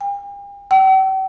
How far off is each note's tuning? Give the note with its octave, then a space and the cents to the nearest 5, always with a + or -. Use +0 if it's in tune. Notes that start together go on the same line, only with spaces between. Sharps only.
G5 +45
G5 -45